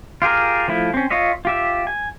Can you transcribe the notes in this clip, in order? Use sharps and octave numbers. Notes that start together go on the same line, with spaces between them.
F4 G4 G#4 A#4
F3 A3 E4
C4 C#4
F4 C#5 D#5 E5
F4 G4 E5
G#5